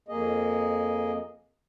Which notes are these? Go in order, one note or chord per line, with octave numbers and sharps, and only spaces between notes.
F2 A#3 G#4 D#5